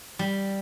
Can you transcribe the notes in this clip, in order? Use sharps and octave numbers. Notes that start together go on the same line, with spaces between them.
G3